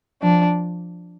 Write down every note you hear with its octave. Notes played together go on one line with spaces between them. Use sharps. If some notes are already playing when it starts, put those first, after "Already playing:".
F3 D4